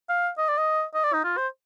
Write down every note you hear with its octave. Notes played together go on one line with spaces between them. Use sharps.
F5
D#5
D5
D#5
D#5
D5
D#4
F4
C5